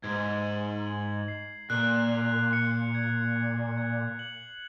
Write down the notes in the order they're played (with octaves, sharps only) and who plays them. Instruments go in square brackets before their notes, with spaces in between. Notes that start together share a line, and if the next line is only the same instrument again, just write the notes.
[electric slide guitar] G#2 [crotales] G#6
[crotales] F#7
F#7
C7
[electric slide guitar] A#2 [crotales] F#6
[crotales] F7
C#7
G#6
G#6
G#6
F#7